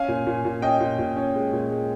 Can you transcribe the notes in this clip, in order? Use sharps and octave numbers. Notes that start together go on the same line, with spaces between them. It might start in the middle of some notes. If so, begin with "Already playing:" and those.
Already playing: C#4 F5 G#5
A#2
A#2
A#2
C#4 D#5 G5
A#2
A#2
C#4
G#3
A#2
G#3